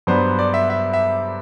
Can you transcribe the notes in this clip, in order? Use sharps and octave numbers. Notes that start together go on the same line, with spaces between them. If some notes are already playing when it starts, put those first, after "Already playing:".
G2 F#3 B3 D4 C5
D5
E5
E5
E5